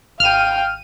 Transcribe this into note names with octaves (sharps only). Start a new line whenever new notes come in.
G#1 F5 G5 F6 D#7